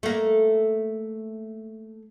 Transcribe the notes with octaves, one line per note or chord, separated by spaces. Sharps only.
A3 A#3